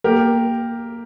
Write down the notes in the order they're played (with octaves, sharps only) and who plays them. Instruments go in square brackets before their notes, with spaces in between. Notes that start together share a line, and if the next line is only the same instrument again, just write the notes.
[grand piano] A#3 G4 A#4